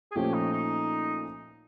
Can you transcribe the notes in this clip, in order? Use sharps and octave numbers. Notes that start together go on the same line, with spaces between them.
G#4
A#2 F3 A3 C#4 G4
D#4
D#4